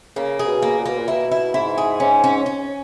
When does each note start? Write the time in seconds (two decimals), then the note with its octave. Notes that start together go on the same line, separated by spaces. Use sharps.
0.16 C#3 A#3
0.39 G#4
0.47 B2
0.62 A#3
0.78 A#2
0.85 B2 A#3
0.98 A#2
1.08 B2 E4
1.32 E4
1.54 G#2 E4
1.78 G#4
2.00 G#2 C#4
2.24 C#4
2.46 C#4